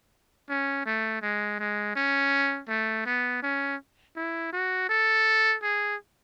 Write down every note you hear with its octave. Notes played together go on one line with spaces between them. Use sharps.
C#4
A3
G#3
G#3
C#4
A3
B3
C#4
E4
F#4
A4
G#4